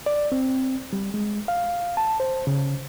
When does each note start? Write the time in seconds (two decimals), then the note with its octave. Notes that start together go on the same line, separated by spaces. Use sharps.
0.06 D5
0.32 C4
0.93 G3
1.14 G#3
1.48 F5
1.97 A5
2.20 C5
2.47 C#3